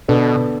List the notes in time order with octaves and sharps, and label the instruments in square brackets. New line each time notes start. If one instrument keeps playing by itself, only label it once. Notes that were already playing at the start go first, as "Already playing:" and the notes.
[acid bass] B2 [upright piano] D3 B3 D4 A4 D5